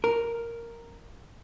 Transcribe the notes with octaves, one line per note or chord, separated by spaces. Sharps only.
A#4